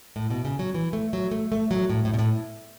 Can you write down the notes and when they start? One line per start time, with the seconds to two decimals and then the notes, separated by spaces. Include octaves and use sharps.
0.16 A2
0.30 B2
0.45 C#3
0.59 F#3
0.74 E3
0.93 A3
1.13 F#3
1.31 A3
1.52 A3
1.71 F#3
1.90 A2
2.05 A2
2.14 B2
2.19 A2